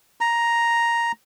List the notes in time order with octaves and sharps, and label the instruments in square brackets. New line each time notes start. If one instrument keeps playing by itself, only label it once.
[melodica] A#5